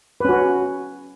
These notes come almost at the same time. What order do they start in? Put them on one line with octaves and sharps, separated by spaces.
B4 C#4 F#4